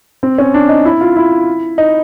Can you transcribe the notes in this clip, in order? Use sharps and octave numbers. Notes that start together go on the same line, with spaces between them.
C4
C#4
D4
D#4
E4
F4
E4
D#4